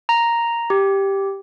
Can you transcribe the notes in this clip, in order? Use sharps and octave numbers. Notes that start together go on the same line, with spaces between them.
A#5
G4